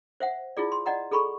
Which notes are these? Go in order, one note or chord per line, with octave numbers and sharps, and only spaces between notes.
C5 E5 F#5
E4 F4 G#4 D5
C6
D5 D#5 F#5 A#5
G#4 A4 B5 C#6